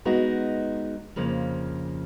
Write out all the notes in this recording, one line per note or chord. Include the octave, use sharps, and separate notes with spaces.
G#3 B3 D#4 F#4
F2 C#3 F3 A#3